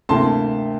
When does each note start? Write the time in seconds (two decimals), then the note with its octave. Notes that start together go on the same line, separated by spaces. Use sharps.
0.09 D2 C3 E3 A#3 A5 C6